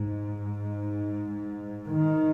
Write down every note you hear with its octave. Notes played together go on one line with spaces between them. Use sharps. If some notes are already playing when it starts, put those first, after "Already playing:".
Already playing: G#2
D#3